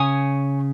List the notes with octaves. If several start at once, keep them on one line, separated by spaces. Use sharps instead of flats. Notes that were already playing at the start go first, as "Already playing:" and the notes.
Already playing: C#3 C#5 G#5 D#6